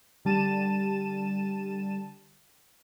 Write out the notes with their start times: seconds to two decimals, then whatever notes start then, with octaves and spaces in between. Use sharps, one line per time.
0.25 D3 G3 A5 D#7 E7